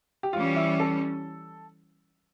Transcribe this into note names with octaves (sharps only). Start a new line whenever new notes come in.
G4
E3 G3 C#4 F4
E4
A4